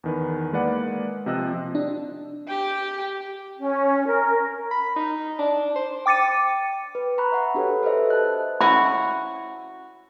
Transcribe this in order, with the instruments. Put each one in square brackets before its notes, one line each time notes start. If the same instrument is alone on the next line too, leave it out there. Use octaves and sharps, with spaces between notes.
[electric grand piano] E2 D#3 B4
G#3 A#3 B4 D5 F#5
C3 F3 C4 D#5 E6 F#6
[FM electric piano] D4
[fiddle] G4 G5
[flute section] C#4
A#4
[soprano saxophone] B5
D#4
D4
C5
[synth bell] G5 D6 A6 C#7 D#7
[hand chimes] B4
A#5 B5 C#6 F#6
E5 F#5 B5
D4 F#4 G4 A4 B4 C#5
A4 B4 C5 D#5 E5
A5 F#6
[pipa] C#4 E4 F#4 [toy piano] B5